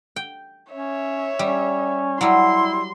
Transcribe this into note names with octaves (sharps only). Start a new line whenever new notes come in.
G5
C#4 C#5 E5
G3 C#4
F#3 G3 E4 C6